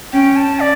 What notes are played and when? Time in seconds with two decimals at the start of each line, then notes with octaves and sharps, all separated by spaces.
0.13 C#4 G5
0.36 A5
0.60 D5